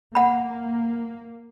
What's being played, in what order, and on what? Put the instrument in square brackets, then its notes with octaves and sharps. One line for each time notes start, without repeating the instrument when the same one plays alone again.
[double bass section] A#3 [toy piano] F#5 B5